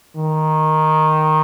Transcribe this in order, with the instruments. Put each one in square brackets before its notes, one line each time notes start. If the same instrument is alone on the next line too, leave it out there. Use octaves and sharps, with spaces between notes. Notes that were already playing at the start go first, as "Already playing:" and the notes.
[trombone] D#3